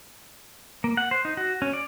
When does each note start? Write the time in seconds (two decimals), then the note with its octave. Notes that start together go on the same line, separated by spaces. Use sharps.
0.84 A#3
0.97 F#5
1.11 C5
1.25 D#4
1.37 F#4
1.62 C#4
1.73 D5